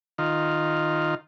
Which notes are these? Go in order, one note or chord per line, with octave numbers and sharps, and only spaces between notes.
D#3 F4